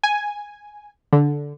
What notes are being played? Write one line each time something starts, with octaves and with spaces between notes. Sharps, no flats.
G#5
D3